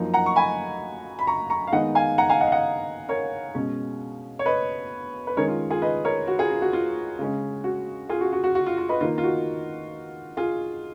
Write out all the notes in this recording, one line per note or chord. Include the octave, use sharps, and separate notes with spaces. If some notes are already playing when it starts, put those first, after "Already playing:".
Already playing: F#2 F3 A#3 D#4
F#5 A#5
C#6
G#5 B5
B5
A#5 C#6
A#5 C#6
F5
D#3 G#3 B3 D#4 D#5 F#5
F5 G#5
F#5 A#5
F5 G#5
D#5 F#5
F5
D#5 F#5
A#4 C#5
B2 G#3 C#4
C#5
B4 D#5
B4
D#3 G#3 C#4 A#4 C#5
F4
F4 G#4
B4 D#5
A#4 C#5
F#4
F4 G#4
F4
F#4
F4
C#3 G#3 C#4
F#4
F4 G#4
F#4
F#4
F#4
F#4
F4
F4
B4 D#5
D#3 A#3 D#4 F4
F4
F#4
F4 G#4